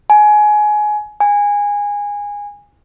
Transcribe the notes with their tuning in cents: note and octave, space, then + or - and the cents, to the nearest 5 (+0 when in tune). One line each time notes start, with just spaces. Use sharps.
G#5 +20
G#5 -20